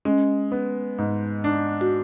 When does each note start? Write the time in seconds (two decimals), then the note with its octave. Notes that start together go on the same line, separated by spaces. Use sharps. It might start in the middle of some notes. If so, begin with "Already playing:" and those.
0.05 G#3 C#4
0.52 B3
0.98 G#2
1.44 D4
1.81 F#4